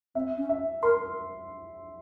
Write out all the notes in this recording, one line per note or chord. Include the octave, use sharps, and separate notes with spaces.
C4 E5
C#4
E5
A#4 C6